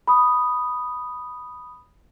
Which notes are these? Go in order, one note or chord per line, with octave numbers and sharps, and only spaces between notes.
B5 D#6